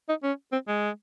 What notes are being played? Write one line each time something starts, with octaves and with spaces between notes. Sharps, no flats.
D#4
C#4
C4
G#3